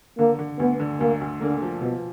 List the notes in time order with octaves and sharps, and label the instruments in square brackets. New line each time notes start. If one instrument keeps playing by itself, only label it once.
[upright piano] D3 [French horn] A#3
[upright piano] D3
[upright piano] D2 [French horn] B3
[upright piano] D3
[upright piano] D2 [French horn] A#3
[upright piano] D2
[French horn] D3 [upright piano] A#3
[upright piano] F3
[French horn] B2 [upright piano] F3